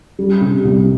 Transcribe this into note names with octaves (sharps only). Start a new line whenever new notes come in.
G3
C3
C2